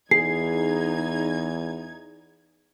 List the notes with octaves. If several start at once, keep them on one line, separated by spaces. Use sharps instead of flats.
E2 D#4 G#4 G#6 C7